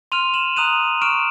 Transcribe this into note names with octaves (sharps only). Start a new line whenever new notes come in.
C6 F6 D#7 F7
E7 F#7
A#5 D#6 F#6 D#7 F7
C#6 F6 D7 E7